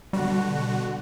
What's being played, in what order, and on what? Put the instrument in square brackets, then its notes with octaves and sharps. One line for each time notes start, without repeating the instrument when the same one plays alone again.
[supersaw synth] B2 D3 F#4 [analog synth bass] G3